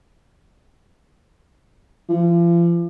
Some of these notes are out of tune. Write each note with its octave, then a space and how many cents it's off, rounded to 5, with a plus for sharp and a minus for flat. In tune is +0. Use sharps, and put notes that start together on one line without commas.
F3 -40